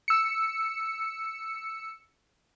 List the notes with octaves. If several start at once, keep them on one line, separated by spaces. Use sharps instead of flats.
E6 C#7